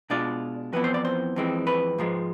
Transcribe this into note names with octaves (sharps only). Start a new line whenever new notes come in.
B2 G#3 D4 F4 D5
F2 E3 B3 E4 B4
C5
D5
C5
F2 E3 G#3 C4
B4
G#2 F3 G#3